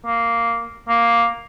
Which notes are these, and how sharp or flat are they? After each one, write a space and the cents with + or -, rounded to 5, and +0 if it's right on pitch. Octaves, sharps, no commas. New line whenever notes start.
A#3 -5
A#3 +5